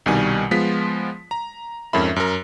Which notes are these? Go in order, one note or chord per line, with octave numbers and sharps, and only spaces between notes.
C2 B2 D#3 G3 G#5
F3 G#3 B3 F4 B6
A#5
F2 G#2 C#4 A#4 E5 B5
F#2 A#4